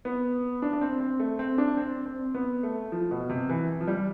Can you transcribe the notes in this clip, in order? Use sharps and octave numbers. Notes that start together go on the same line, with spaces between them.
B3
D4
D4
C4
C4
A3
C4
D4
C4
C4
B3
A3
F3
B2
C3
E3
F3
G3